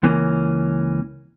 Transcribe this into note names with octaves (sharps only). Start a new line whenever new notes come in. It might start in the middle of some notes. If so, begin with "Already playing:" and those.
C#2 E3 A#3 C#4